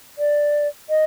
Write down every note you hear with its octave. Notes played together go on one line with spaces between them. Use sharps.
D5
D#5